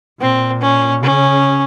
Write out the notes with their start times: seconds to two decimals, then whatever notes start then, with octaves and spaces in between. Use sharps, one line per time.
0.21 A#2 C4
0.62 C#4
1.03 C#3 C#4